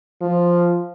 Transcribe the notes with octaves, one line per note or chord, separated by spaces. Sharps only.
F3